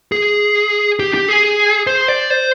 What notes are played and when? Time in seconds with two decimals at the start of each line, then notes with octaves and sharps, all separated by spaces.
0.12 G#4
0.99 G4
1.14 G4
1.28 G#4
1.87 C5
2.08 D5
2.30 C5